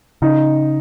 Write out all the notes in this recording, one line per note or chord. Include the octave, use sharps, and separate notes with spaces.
C#3 D#4